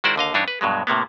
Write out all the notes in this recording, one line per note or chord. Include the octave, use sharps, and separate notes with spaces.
D#3 G#3 E4 F#4 C5 D5
D#2 D3 D#5 F5
G2 E3 D4 D#4 C#5
B4
G2 B2 F#3 G#3
A2 C3 A#3 B3